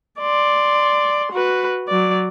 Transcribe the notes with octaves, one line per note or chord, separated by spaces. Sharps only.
D5 C6
F#4 B4
F#3 D5